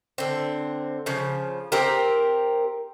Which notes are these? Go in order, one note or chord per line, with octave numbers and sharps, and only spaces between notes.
D3 C4
C#3 F3
C4 G4 A#4